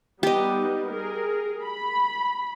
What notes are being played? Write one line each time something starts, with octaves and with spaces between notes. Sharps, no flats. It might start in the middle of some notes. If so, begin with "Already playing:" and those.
G3 B3 D#4 G4 D#5
G#4 A#4
B5